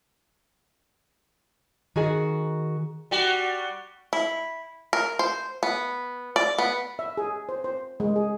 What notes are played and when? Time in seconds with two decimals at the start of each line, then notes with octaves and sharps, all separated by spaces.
1.96 D#3 F#4 G#4 G#5
3.11 G3 F#4
4.13 E4
4.93 A#4
5.19 C5
5.63 B3
6.36 D5
6.58 B3
6.99 E5
7.17 G#4
7.49 C5
7.64 C5
8.00 G#3
8.16 G#4